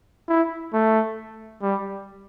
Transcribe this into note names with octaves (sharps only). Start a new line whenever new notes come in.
E4
A3
G3